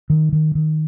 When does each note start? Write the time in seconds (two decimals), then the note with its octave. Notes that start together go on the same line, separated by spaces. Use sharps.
0.10 D#3
0.33 D#3
0.55 D#3